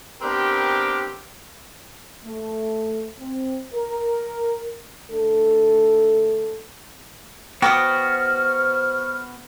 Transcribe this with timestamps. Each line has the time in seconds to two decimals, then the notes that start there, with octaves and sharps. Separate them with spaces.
0.22 B3 C4 D4 G4 A#4
2.24 A3
3.19 C4
3.74 A#4
5.10 D3 A3 D4 A4
7.62 B3 F#4 C5 G5 D6 D#6 F6